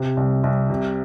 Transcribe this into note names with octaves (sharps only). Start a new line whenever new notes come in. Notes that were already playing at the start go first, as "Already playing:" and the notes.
Already playing: C3
C2
C2
C3